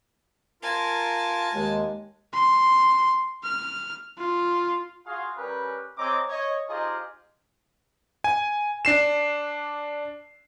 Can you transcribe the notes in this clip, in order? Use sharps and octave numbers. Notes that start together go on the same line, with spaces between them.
F4 A#4 G#5 A5
D#2 G#3
C6
F6
F4
F4 F#4 G#4 F5
G3 C#4 G4 A#4 B4
G#3 C4 C#5 D#5 A#5 D6
C#5 D#5
D#4 F4 G4 G#4 C5 D#5
G#5
D4 C7 E7